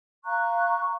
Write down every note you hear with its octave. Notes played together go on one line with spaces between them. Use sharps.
F5 A#5 C#6 F#6